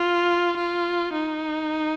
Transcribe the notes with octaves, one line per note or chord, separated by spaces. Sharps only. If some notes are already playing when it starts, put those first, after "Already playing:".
Already playing: F4
F4
D#4